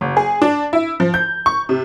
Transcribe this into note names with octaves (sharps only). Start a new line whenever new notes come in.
F#1
G#4
D4
E4
F3
G6
C#6
C3